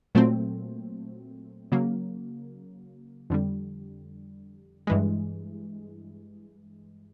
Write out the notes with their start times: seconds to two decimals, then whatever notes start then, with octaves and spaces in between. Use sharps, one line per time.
0.15 A#2 F#3 A3 C4
1.72 C#3 F#3 A#3
3.30 F2 D3 G3
4.87 G2 E3 G#3